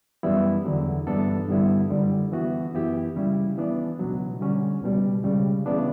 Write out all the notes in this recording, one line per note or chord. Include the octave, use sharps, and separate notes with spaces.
F#2 E3 G3 B3 E4
E2 D3 F#3
G2 E3 B3 D4 A4
G2 D3 G3 B3 E4
F#2 D3 G3
E3 B3 F#4
F#2 E3 B3 E4 G4
C#2 C#3 G3 C#4 E4
E3 B3 D4
C#2 B2 F#3
D3 G3 C#4
C#2 B2 G3
C#2 C#3 G3
C#3 E3 B3 D4